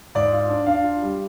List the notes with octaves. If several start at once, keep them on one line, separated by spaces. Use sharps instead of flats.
G#2 D5
F4
D4
D4 F5
F4
G3